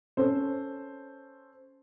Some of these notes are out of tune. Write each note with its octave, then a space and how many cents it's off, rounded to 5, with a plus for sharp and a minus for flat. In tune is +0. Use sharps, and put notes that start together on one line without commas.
C#4 +0 A4 -5 C5 +0